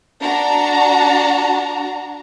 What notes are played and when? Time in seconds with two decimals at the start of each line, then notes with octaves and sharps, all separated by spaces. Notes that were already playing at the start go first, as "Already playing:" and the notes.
0.21 D4 F#4 A5 A#5